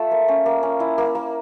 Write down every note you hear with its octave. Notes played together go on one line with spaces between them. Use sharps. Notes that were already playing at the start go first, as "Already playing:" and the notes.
Already playing: A3 F4 E5
A#3
C#4
A#3
C#4
E4
A#3
A#3